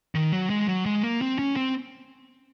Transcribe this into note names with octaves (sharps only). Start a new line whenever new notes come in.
D#3
F#3
G#3
F#3
G#3
A#3
C4
C#4
C4